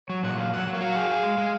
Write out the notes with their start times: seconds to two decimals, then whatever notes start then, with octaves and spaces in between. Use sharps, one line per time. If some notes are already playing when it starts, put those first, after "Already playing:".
0.09 F#3 C#5
0.23 A#2 F#5
0.37 F#3 F5
0.53 F#3 F#5
0.67 F#3
0.73 A#4 C#5 F5
0.81 F#4
0.96 G#4
1.10 G#4
1.23 G#3
1.38 G#3